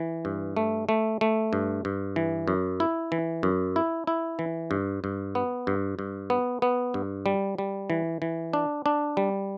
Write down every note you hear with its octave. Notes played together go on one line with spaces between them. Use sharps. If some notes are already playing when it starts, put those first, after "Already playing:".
Already playing: E3
G2
A3
A3
A3
G2
G2
E3
F#2
E4
E3
F#2
E4
E4
E3
G2
G2
B3
G2
G2
B3
B3
G2
G3
G3
E3
E3
D4
D4
G3